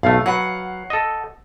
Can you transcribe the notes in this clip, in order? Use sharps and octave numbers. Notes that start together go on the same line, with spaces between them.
B1 A3 F5
F#3 B4 F#5
A4 D#5